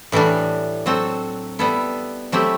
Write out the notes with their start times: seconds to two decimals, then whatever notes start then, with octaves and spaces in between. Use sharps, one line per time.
0.12 A2 E3 G3 D4
0.86 F#3 C4 F#4 A4
1.59 G3 B3 E4 A4
2.32 F#3 A3 C4 E4 G4